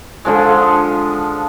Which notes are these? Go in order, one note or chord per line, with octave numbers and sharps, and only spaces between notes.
D3 F3 G#3